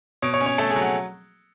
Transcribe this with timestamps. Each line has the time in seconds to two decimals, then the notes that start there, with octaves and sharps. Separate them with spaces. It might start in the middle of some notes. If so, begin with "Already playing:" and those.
0.22 B2 C#5
0.34 C#5
0.41 C#4
0.46 C#5
0.58 A3 A4
0.70 G#4
0.76 F#3
0.82 F#5